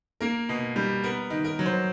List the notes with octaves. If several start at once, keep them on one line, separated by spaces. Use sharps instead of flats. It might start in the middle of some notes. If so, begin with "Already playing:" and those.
A#3 A#4
B2
G3
B3 A#4
D#3
A#4
F#3
C5